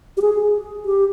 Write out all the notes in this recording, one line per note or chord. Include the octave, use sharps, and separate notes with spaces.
G4
G#4
G4